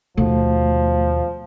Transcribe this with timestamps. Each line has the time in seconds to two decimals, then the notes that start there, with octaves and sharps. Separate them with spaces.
0.17 D#2 B2 F3 A3